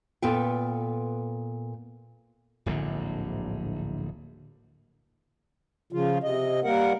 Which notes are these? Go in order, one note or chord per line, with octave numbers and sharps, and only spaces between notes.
A#2 B3 A4 B4 G5
D1 A#1 G#2 D3
C#3 F3 F4
C3 D#5
G3 A#3 A#4 F#5